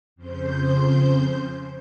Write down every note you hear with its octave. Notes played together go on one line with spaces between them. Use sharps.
F2 C#3 C5 G6